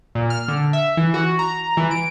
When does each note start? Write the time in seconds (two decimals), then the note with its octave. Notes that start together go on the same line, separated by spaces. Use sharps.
0.15 A#2
0.30 F6
0.48 D3
0.73 E5
0.97 E3
1.14 F#4
1.39 A#5
1.77 E3
1.91 D7